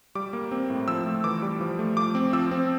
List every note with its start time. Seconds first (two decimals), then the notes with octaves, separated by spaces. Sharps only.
0.15 G3 D6
0.33 A#3
0.51 C4
0.70 A2
0.88 F3 E6
1.06 A3
1.24 E3 D6
1.42 G3
1.61 F3
1.79 A3
1.97 F3 D6
2.15 C4
2.33 F3 E6
2.51 C4